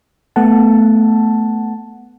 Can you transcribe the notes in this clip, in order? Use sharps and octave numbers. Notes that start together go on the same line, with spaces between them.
A3 B3 F#5 A5